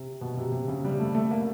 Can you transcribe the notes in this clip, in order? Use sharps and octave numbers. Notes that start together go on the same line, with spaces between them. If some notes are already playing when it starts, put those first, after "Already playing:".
Already playing: C3
B2
C3
C3
C#3
G3
A3
A3
A#3